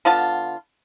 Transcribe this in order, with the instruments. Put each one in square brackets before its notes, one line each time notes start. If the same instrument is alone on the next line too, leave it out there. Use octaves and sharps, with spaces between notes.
[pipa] D3 B3 F4 A5